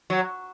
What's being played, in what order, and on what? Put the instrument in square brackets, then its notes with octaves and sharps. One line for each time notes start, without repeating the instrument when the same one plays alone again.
[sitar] F#3